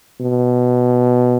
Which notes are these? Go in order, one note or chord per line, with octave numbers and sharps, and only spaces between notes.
B2